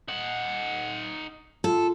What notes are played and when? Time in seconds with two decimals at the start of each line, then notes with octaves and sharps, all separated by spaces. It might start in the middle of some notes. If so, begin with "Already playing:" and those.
0.08 D#4 F#5
1.64 F4 A4